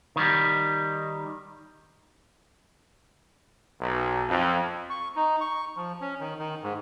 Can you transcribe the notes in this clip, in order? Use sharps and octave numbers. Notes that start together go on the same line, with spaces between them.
D#3 G3
B1
F2
C#6
D#4
C#6
F3
C#4
D#3
D#3
G#2